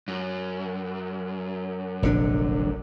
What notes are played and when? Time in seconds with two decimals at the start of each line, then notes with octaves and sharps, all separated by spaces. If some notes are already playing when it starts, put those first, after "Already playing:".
0.08 F#2
2.03 F1 A#1 D3 D4